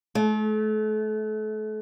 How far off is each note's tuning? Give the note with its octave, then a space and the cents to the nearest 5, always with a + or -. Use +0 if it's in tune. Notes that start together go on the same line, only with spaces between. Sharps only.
A3 -35